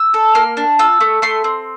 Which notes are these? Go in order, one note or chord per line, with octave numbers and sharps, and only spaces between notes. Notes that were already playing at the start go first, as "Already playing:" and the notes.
Already playing: E6
A4
A#3 F6
D4
F4 E6
A3
A3 C6
C4